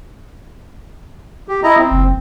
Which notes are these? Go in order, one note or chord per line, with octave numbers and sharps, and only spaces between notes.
G4
E4 D#5 A#5
C4
F#1